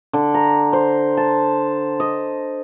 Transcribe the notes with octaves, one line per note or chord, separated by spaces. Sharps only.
D3
A#5
C5
A5
D#5